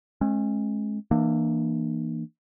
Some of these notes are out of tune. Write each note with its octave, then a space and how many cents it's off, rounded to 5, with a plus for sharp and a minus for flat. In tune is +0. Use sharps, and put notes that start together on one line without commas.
G#3 +30 C#4 -35
E3 +0 A#3 +0 D4 +40